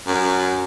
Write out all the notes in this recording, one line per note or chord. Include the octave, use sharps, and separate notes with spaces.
F#2